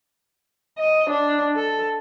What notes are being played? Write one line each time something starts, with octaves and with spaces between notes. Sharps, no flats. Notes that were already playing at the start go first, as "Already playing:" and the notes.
D#5
D4
A4